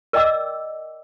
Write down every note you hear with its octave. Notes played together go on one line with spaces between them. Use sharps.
A#4 D5 D#5 G5 D6 E6